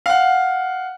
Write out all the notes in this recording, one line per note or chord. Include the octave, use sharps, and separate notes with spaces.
F5 F#5